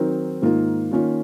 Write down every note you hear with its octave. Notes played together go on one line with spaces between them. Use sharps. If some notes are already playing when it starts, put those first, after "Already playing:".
Already playing: D#3 F#3 C4 D#4 A#4
G#2 D#3 A#3 F4 A#4
D#3 A#3 C#4 F4